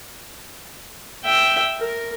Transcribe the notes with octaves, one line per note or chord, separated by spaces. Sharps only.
E5 G5
A#4